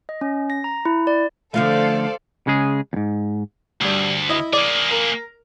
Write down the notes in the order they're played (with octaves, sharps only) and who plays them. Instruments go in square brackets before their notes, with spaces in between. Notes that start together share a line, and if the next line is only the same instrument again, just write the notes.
[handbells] D#5
C#4
A#6
A#5
E4
D5
[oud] D3 F3 A3 [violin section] A4 C5 D5 [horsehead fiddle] F5
[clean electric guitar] C#3 G#3 G#4
E2 G#2
[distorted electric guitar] D2 [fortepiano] G2 G3
[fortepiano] E4 D#5
[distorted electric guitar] A#3 G#4 [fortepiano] D5 D6
[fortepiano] A#4